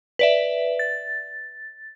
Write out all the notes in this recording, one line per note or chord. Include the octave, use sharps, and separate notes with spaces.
B4 D5 E5
A6